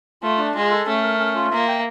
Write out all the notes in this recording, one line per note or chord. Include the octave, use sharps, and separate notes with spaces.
A3 F4
D4
G#3 F4
A4
A3 C#4
A#4
C#4
F4
A#3 E5
G5